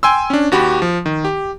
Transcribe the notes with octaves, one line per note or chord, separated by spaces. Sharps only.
G5 G#5 C6 E6
C#4 D4
D#2 F#4 G4 B5
F3
D#3
G4